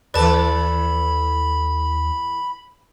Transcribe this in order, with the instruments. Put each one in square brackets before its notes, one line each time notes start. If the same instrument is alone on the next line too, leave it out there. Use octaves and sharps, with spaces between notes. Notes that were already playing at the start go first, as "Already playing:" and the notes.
[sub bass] D#2 [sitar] E3 A4 D5 [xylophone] B4 A5 [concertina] B5